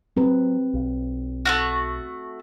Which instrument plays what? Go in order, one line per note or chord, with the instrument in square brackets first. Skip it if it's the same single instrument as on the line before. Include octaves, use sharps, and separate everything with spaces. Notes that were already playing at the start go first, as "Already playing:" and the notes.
[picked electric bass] F#3 [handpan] C4 B4
[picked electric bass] B1
[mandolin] A3 C#4 F#4